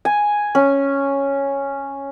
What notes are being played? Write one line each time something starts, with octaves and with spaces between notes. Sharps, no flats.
G#5
C#4